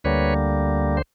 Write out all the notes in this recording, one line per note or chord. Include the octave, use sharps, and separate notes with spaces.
D2 D3 G3 A#3 B4 C#5
C5